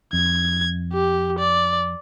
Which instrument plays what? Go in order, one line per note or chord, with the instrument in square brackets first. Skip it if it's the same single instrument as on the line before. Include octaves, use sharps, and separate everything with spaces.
[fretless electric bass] F2 [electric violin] G#6
[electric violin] G4
D5